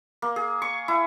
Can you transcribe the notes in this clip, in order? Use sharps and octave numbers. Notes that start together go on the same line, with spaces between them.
A#3
G#4
C#6
E4